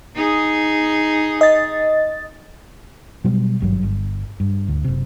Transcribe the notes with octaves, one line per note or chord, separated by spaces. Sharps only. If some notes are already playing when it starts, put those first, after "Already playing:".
D#4 G#4
D#5 A6
B2 F#3 G3
G#1 G2 C#3 F#3
G1
G2
D2
F#1 C3